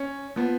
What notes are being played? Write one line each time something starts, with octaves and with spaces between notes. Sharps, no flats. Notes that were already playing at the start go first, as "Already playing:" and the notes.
Already playing: C#4
F3 B3